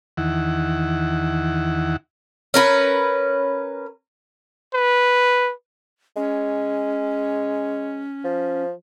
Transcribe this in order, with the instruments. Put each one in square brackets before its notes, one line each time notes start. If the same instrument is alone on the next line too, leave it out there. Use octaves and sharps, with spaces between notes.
[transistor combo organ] E2 D#3 E4 F#5
[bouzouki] C#4 A#4 B4
[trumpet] B4
[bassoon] G#3 [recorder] C#4
[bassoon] F3